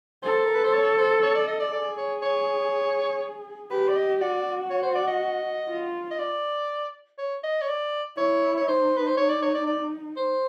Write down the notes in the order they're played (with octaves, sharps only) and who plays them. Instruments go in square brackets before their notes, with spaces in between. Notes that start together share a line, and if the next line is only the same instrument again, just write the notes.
[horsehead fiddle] A4 [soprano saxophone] C5
[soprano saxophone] A#4
B4
C5
C#5
C5
C#5
D5
D#5
D5
[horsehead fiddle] G#4 [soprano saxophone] D5
[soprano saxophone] C#5
C#5
[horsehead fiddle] G4 [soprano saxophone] B4
[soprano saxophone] D5
D#5
[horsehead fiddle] F#4 [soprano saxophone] D5
[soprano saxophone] C#5
C5
D5
D#5
[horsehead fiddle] F4
[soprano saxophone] D#5
D5
C#5
D#5
C#5
D5
[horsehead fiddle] E4 [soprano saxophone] C#5
[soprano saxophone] C#5
[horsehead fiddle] D#4 [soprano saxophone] C5
[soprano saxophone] B4
C5
C#5
D5
C#5
D5
D5
C5